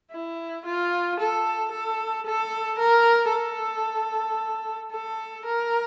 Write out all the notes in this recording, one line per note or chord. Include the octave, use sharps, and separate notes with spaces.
E4
F4
A4
A4
A4
A#4
A4
A4
A#4